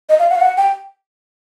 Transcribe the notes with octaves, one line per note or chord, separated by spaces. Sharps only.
D#5
F5
F#5
F5
F#5
G5